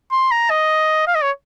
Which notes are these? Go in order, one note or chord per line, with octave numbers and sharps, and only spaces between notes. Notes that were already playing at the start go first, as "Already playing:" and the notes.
C6
A#5
D#5
F5
D#5
C#5